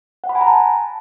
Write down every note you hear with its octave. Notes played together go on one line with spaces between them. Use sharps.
F#5
B5
G#5
A#5
A5